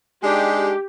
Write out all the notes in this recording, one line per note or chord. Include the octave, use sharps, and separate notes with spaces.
G#3 D4 D#4 G4